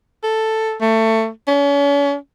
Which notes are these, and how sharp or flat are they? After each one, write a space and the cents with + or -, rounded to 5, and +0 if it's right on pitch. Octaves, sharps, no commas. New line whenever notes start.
A4 +5
A3 +20
C#4 +40